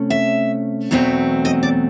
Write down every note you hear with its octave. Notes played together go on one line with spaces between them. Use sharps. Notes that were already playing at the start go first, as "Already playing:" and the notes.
Already playing: C3 A3 C#4
E5
E2 B2 F#3 A3 C4
D#5
D5